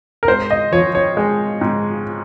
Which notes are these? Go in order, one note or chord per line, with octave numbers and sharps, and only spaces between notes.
A#4
G#2 C5
D#5
F3 C#5
C#5
G#3
G#2